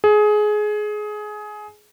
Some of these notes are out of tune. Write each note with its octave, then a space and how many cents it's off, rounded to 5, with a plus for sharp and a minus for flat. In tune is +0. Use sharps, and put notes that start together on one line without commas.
G#4 +20